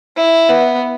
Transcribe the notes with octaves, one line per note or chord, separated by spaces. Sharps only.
E4
B3